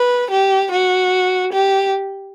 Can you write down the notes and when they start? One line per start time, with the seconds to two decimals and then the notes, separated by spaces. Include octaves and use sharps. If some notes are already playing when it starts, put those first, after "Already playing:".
Already playing: B4
0.31 G4
0.71 F#4
1.53 G4